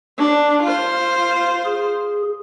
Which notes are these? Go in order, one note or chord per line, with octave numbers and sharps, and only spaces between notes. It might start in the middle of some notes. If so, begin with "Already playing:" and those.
D4
F4 C5
G#4